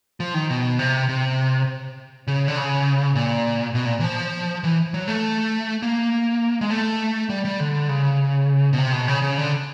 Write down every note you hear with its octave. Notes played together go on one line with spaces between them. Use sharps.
F3
D#3
B2
C3
C3
C#3
D3
C#3
A#2
B2
A#2
E3
F3
E3
F#3
A3
A#3
G#3
A3
G3
G3
D3
C#3
B2
C3
B2
C#3
C#3
D3